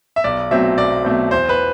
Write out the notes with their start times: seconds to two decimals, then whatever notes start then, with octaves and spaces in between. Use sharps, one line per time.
0.16 E5
0.24 B1 D5
0.51 B2 F#3 A3 C4 E5
0.78 B1 D5
1.04 B2 F#3 A3 C4
1.31 E2 C5
1.49 B4